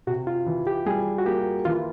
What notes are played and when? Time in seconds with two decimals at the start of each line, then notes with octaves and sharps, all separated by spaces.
0.07 C3 F#4
0.27 F4
0.46 E3
0.67 G4
0.86 G3 G#4
1.19 F#4
1.26 A#3 G4
1.65 E3 F4